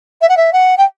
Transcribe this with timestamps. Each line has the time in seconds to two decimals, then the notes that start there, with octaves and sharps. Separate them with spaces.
0.21 E5
0.29 F#5
0.37 E5
0.53 F#5
0.77 G5